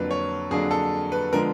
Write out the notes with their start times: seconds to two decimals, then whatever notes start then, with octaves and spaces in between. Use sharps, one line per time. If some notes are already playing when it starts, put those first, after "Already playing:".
Already playing: F2 D3 F#3 A#3 D4 B4
0.11 C#5
0.51 F2 D3 F#3 A#3 D4 G#4
0.71 A4
1.12 B4
1.33 D3 F3 G#3 B3 A#4